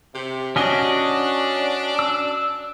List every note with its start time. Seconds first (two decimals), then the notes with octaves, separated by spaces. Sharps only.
0.14 C3
0.56 C#4 D4 F#4 D#5
1.99 E6